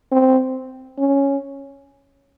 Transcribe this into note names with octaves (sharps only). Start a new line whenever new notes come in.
C4
C#4